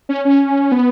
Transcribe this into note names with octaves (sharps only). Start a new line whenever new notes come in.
C#4
C#4
B3